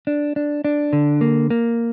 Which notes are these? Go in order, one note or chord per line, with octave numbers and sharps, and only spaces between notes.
D4
D4
D4
D3
A#3
A#3